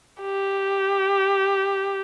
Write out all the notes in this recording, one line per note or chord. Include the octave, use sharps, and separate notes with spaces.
G4